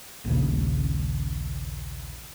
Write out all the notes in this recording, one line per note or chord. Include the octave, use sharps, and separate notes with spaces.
A#1 D#2 C#3